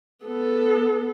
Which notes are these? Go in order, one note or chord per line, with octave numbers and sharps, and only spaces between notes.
B3 A4